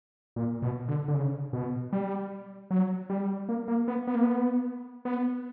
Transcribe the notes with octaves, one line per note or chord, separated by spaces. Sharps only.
A#2
B2
D3
D3
C#3
B2
G3
F#3
G3
A#3
A#3
B3
B3
A#3
B3
B3